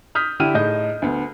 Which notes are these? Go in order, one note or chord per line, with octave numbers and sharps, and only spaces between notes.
D#6 F6 G6 B6
D3 E4 G4 F6 D#7
A2 D#4 G#4 D#5 G6
D2 B3